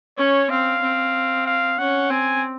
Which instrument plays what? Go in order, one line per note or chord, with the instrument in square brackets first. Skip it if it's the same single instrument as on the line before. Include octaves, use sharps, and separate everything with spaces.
[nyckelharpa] C#4 [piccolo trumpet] C#5
[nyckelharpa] C4 [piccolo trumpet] F5
[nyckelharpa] C4
[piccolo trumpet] F5
[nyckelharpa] C#4 [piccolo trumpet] F#5
[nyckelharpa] C4 [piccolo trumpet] G#5